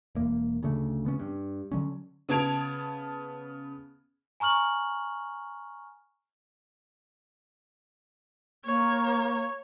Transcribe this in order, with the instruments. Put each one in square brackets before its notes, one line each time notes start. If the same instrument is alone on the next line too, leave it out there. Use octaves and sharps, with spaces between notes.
[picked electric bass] E1 A#3
D2 C#3 A3
C#3 B3 C#4
G2
D3 F#3 C#4
[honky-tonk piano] C#3 B3 A5 G#6 D7 F7
[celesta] G#5 A#5 C#6 F6 F#7
[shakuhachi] A#3 [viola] C#5